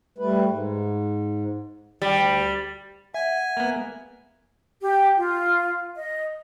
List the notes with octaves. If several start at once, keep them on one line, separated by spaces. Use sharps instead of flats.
G3 A3 B4
G#2
D2 G3
E5 F#5 G#5
A#3 B3
G4
F4
D#5